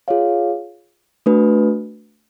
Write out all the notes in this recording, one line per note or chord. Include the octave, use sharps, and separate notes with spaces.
F4 G#4 C#5 F5
A3 D4 F#4 B4